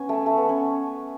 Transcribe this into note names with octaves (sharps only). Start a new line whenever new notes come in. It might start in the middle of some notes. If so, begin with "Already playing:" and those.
Already playing: B3 C#4
A3
A3
B3
C#4